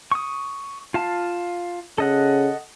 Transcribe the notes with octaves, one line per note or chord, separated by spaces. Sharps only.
C#6 D#6
F4 F5 A5
C#3 A4 D#5 F#5